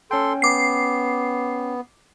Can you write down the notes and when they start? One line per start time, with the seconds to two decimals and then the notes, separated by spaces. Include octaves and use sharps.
0.11 C#4 A4 G5 C6
0.42 B3 D6 C7